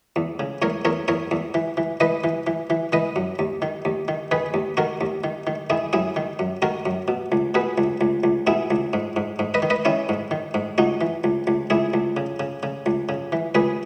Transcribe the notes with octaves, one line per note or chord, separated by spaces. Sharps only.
E2
C#3
E2 A#4 C#5
E2 A#4 C#5
E2 A#4 C#5
E2
E3
E3
E3 B4 D#5
E3
E3
E3
E3 B4 D#5
F#2
D#2
D#3
D#2
D#3
D#3 G#4 B4
D#2
D#3 F#4 A#4
D#2
D#3
D#3
D#3 E4 G#4
F#2 E4 G#4
D#3
F#2
D#3 F#4 A#4
F#2
B2
C#2
B2 G#4 B4
C#2
C#2
C#2
B2 E4 G#4
C#2
G#2
G#2
G#2
B4 D#5
D#3
B4 D#5
D#3 C#4 E4
G#2
D#3
G#2
C#2 D#4 F#4
E3
C#2
C#2
C#2 E4 G#4
C#2
C#3
C#3
C#3
C#2
C#3
E3
C#2 G#4 B4